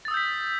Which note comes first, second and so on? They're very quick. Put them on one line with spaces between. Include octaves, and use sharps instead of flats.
A6 D#6 E6 G6 B6